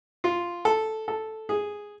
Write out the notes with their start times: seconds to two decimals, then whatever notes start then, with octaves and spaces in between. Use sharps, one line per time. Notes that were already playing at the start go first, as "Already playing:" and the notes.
0.24 F4
0.65 A4
1.08 A4
1.49 G#4